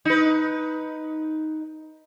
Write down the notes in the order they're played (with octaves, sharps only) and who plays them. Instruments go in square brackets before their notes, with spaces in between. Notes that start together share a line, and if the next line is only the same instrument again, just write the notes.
[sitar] D#4 B4